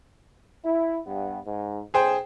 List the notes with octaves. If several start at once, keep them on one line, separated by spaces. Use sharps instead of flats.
E4
G2 B3
G#2
B1 G#4 C5 G5